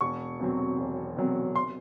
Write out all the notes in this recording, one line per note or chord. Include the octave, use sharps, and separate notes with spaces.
E1 C#6
E2 C3 F#3 C4
E1
E2 C3 F#3 C4
C6